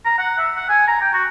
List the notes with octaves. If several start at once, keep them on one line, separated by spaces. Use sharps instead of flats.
A#5
F#5
E5
F#5
G#5
A#5
G5
F#4